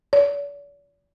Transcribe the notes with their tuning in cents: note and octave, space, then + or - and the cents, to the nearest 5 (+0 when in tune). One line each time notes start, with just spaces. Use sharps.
D5 -45